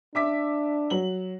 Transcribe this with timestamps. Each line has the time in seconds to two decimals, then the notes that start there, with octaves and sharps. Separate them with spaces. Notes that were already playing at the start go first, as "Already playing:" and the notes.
0.15 D4 E5 D6 B6
0.90 F#3 F#7